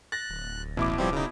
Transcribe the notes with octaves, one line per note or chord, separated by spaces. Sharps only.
F#6 A6 A#6
D1
A1 B2 E4 D6
F3 G3 C4
C#3 D#4